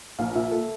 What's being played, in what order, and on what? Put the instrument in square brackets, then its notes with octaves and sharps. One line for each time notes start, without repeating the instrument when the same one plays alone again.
[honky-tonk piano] A#1 [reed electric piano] F5
[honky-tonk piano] A#2 [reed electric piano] E5
[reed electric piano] A4